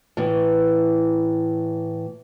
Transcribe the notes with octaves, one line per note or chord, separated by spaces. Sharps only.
A2 E3